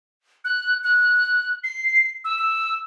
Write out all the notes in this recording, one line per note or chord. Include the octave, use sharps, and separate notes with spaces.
F#6
F#6
C7
E6
E6